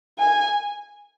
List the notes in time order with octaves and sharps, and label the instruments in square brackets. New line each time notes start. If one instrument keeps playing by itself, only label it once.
[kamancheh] G#5